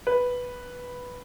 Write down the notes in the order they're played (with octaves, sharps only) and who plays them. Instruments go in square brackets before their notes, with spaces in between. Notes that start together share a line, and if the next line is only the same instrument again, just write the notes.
[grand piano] B4